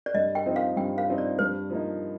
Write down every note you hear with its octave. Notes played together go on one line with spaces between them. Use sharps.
D5
G2 D#5
G5
F3 C4 D#4
F5
G2 G5
F5
F3 C4 D#4
D5
G2 C5
F3 A#3 D#4